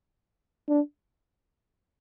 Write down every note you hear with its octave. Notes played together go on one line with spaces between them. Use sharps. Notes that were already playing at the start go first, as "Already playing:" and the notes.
D4